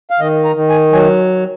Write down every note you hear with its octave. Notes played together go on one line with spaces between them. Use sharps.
F5
D#3 D#5
A#5
D#3
G#5
F#3 G#5